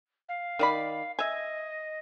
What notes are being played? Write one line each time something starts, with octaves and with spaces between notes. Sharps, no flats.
F5
D#3 D5 B5
D#5 E5 G#5